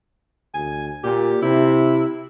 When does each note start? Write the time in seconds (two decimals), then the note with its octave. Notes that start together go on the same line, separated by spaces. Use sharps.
0.54 D2 G#5
1.04 A#2 G4
1.42 C3 E4